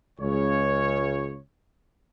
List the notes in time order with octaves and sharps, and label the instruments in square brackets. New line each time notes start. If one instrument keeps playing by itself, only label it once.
[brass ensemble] C#2 C#3 C#5